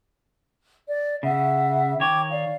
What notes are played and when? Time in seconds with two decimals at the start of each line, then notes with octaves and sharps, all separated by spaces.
0.86 D5
1.23 C#3 E5 F#5
2.00 D#3 C#5 G5 D6 G#6
2.31 D5 F5